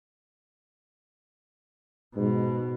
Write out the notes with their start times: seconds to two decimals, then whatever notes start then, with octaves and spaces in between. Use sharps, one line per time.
2.16 G#2 B2